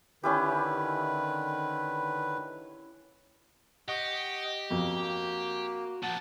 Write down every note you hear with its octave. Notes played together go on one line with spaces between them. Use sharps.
D3 D#3 C#4 E4 G4 B4
G4 D#5 F#5 C#6
F2 A#3 F#4
A#2 F3 F#5 A5